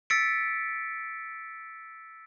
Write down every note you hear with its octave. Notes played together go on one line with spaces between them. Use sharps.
E6 A6 B6 C#7 D7